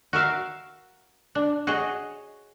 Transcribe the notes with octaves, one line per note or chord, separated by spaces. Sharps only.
F#4 A#4 E5 F5
D4
F#4 G#4 C#5 D#5